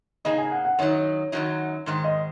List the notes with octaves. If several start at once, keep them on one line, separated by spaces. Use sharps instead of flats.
C#3 A#3 D#4 G#4 D#5
G#5
F#5
F#5
F#2 D#3 F#3 D#4 C#5
F#2 D#3 F#3 D#4
G#2 D#3 G#3
D#5